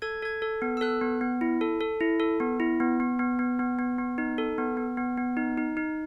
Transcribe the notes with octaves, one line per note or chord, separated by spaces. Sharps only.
A4 G#6
A4 G#6
A4
B3
E6
A4 F#6
B3
B3
E4
A4
A4
E4
A4
B3
E4
B3
B3
B3
B3
B3
B3
B3
D#4
A4
B3
B3
B3
B3
D#4
D#4
D#4